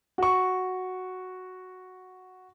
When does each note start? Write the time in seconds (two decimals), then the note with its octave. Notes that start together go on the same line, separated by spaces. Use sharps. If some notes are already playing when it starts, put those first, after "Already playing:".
0.18 F#4 C#6